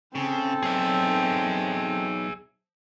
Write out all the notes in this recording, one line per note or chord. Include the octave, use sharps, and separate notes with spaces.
C#3 C4 A4
B1 G#4 E5